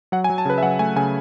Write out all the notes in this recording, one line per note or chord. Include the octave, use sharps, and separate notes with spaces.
F#3 F#5
G#5
F#3
A5
C#3 B4
E5
F#3 F#5
A3 G#5
C#3 G#5